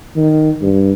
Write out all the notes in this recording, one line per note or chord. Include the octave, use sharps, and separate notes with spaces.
D#3
G2